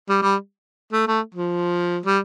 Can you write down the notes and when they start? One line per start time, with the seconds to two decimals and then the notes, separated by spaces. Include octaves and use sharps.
0.09 G3
0.22 G3
0.93 A3
1.07 A3
1.35 F3
2.06 G3